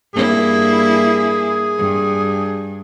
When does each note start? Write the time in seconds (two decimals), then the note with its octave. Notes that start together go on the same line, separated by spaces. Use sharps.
0.14 G2 A#3 E4 G#4
1.78 G2